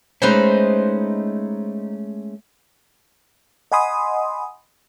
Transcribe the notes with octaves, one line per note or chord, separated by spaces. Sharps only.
G#3 A3 C#4 D#4 B4 C5
D#5 F#5 G#5 B5 C6 D#6